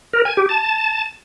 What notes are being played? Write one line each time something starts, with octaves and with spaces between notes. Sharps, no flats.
A#4
G#5
G4
A5